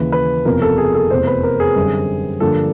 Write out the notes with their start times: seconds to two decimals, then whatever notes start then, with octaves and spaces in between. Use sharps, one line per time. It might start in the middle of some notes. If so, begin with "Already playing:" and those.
Already playing: D#2 C#3 E3 B4
0.12 B4
0.45 F#1 E2 C3 F3 A#4
0.62 A4
0.78 G#4
0.94 A4
1.10 F1 E2 C3 C5
1.27 B4
1.43 A#4
1.60 G#4
1.76 F#2 D3 G3 C4
2.40 G2 D3 F3 A#3 D4 A4